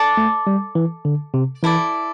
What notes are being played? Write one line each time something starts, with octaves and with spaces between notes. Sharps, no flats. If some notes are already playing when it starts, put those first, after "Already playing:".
Already playing: A4 D5 A5 D6
A3
G3
E3
D3
C3
E3 E4 A4 D5